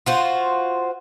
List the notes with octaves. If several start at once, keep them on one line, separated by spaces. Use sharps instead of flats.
F4 F#4 C5